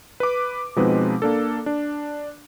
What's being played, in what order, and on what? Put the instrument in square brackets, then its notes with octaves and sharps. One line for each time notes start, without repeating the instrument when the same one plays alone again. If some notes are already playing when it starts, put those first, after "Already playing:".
[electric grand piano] B4 D6
B2 F3 G#3 C4 D#4 B4
A#3 D4 A4
D4